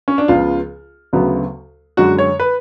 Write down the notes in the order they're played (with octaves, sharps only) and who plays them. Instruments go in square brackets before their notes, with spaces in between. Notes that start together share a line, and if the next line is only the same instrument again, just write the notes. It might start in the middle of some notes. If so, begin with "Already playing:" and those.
[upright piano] C#4
D4
C#2 C#3 F3 B3 F4
D2 C#3 F#3 B3
F#2 D3 G#3 F#4
C#5
B4